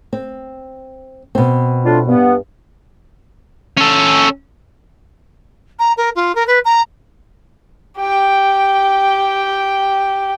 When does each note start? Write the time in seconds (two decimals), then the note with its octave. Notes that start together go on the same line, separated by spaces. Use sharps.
0.13 C4
1.35 B2 C4
1.85 A2 D4 F4
2.06 G2 B3
3.77 C#4 A4
5.79 A#5
5.97 A#4
6.15 F4
6.35 A#4
6.47 B4
6.64 A#5
8.00 G4 G5